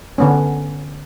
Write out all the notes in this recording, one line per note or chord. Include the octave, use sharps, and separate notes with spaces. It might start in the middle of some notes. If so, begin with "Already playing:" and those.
D3 B3 C#4